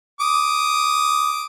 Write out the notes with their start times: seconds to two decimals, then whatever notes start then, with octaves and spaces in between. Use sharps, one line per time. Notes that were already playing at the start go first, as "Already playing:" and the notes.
0.21 D6 D#6